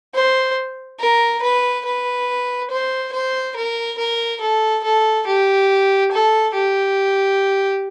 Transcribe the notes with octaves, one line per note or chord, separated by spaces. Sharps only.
C5
A#4
B4
B4
C5
C5
A#4
A#4
A4
A4
G4
A4
G4